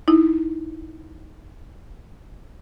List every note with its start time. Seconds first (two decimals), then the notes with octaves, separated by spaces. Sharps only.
0.08 D#4 E4